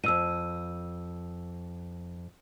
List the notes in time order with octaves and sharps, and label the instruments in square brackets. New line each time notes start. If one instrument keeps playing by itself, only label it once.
[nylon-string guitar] F2 G#2 [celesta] E6 D#7